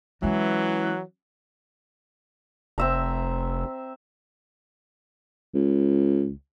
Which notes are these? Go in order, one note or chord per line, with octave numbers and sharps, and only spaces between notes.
E3 F#3 G#3 C#4
F1 C4 E5 A#5
C#2